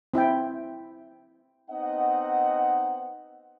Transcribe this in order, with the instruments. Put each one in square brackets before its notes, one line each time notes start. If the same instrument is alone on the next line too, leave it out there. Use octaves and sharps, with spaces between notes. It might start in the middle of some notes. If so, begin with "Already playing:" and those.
[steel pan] C4 E4 E5 G5
[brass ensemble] B3 C4 D#4 D#5 F#5